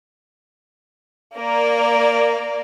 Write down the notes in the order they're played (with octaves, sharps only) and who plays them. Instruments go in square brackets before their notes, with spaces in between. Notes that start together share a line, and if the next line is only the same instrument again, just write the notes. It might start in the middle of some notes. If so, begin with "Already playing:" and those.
[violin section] A#3 A#4 D5